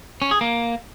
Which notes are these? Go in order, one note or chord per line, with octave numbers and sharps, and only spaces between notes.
C#4
G#4
A#3